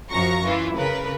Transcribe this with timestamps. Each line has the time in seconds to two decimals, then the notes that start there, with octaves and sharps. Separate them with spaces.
0.11 F#2 F3 F#3 A#5 C#6 A#6
0.45 E3 E4 F4
0.75 C#3 A#4 B4